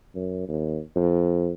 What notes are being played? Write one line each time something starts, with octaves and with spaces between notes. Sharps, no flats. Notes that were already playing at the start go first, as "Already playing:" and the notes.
F#2
D#2
F2